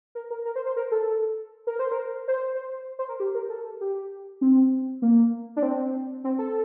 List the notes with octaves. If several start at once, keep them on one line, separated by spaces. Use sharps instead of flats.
A#4
A#4
A#4
C5
C5
A#4
A4
A#4
C5
A#4
C5
C5
C5
A#4
G4
A#4
A4
G4
C4
A#3
D4
C4
C4
A4